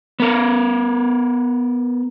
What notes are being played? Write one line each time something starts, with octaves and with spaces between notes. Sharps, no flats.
B3 A#4